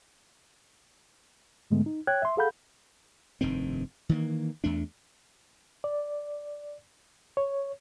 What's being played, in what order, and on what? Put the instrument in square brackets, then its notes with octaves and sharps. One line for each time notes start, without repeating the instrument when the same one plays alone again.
[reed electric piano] G#2 D3 G#3 A3 B3
D#4
C#5 G5 F#6 G#6
E5 C6
G#4 A4 F5 F#5 B5 G6
[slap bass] F1 G2 D#3 C4
D#3 E3 A3 A#3
E2 A3 D4
[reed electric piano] D5
C#5